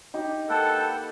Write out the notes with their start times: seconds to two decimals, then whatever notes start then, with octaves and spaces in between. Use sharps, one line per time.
0.14 D#4 G4
0.49 A#3 A4 B4 F#5 G5